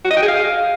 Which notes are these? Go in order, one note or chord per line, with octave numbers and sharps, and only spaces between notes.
F#4
D#5
G5
G#4
F5